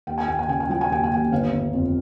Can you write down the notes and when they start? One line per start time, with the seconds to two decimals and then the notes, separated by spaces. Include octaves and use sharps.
0.07 D#2 G5
0.18 G#5
0.28 D#2 G5
0.39 G#5
0.48 C#3 G5
0.60 G#5
0.69 F#3 G5
0.81 G#5
0.90 D#2 G5
1.03 G#5
1.11 D#2 G5
1.32 G1 F5
1.53 G1
1.73 F2